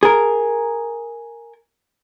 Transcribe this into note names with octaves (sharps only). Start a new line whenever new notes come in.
G#4 A#4